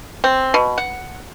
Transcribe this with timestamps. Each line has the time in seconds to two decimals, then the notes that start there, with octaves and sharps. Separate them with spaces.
0.24 C4
0.54 B2
0.78 F#5